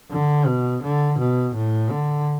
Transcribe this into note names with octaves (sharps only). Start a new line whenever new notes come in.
D3
B2
D3
B2
A2
D3